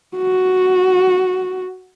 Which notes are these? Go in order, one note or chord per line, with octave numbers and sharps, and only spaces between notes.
F#4